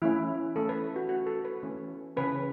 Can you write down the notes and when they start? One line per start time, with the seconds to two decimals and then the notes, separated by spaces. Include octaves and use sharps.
0.02 E3 A3 C#4 E4
0.55 E3 A3 C#4 A4
0.69 B4
0.96 F#4
1.09 E3 A3 C#4 F#4
1.27 A4
1.45 B4
1.63 E3 A3 C#4
2.17 C#3 E3 C#4 B4